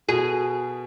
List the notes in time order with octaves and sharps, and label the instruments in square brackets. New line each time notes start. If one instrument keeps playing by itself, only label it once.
[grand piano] B2 [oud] G#4